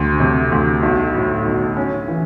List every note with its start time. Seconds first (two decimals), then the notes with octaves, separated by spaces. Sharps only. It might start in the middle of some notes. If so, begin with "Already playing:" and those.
Already playing: D2
0.20 C3
0.52 D2
0.83 B1
1.14 A2
1.46 B1
1.77 C#4
2.08 E3